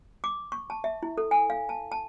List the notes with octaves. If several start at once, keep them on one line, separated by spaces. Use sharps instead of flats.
D6
C#6
A5
E5
E4
A4
G#5
F5
A5
A5